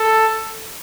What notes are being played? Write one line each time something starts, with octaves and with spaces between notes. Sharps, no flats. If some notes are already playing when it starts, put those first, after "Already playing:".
Already playing: A4